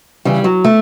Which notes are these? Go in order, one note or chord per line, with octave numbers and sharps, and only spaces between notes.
C#3 E3 G3
F#3
A3